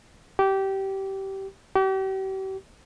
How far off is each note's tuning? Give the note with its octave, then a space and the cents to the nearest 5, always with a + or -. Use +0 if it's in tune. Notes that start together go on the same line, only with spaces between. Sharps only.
G4 -20
G4 -40